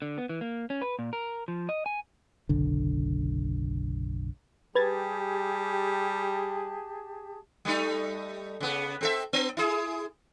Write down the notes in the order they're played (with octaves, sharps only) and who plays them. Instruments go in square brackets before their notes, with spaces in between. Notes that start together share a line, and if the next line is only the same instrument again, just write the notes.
[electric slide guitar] D3
B3
E3
A#3
C#4
B4
A#2
A#4
F3
D#5
G#5
[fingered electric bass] F#1 B1 D3
[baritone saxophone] G3 [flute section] G4 G#4 A5 [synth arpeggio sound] B4 G#6 A6
[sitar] G3 A3 D#4
C#3 B3
C4 A4 E5
B3
E4 G#4